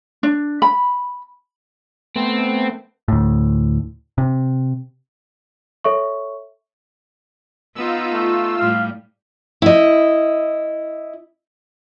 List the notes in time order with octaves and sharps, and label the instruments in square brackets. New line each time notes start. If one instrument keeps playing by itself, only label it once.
[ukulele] D4
B5
[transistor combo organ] A3 B3 [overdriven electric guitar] C4
[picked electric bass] D2 A2
C3
[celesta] A4 C#5 E5 C#6
[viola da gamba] B3 D#4 [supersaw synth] F4 E6
[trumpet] A3
[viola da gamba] A2 G3 [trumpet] F5
[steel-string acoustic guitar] E4 D#5